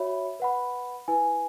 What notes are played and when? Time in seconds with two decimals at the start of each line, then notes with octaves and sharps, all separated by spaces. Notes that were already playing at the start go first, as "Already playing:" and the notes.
Already playing: F#4 C#5 E5 B5
0.40 B4 F#5 B5
1.08 E4 B4 G#5